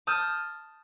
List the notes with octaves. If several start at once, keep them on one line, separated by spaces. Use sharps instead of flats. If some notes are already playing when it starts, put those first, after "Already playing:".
A5 D#6 F6 G6